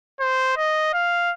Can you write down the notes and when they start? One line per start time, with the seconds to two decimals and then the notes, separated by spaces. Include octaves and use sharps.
0.20 C5
0.57 D#5
0.93 F5